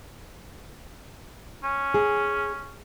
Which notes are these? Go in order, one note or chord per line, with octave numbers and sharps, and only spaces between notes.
C#4
G#4